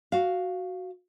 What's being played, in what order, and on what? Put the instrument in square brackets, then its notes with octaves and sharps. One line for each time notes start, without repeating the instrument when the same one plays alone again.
[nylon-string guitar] F#4 F5